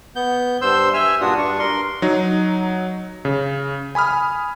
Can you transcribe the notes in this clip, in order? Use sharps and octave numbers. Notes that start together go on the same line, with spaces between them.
B3 G6
G2 C5 C6 E6 G6
E5 G#5 E6 F6
G2 A#2 D4 F4 F#4 D#6
G2 D4 C#6
A#4 C6
F#3 D#4
C#3
G#5 B5 D#6 F6